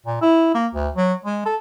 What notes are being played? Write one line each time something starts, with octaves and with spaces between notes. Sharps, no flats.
A#2
E4
A#3
D2
F#3
G#3
A4